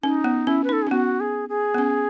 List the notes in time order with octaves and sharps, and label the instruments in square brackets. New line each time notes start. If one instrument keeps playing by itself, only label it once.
[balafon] C#4 [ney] D#4
[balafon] B3
[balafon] C#4 [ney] E4
[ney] B4
[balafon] D#4 [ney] A4
[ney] G#4
[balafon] C#4
[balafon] B3 [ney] F#4
[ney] G#4
G#4
[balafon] B3
C#4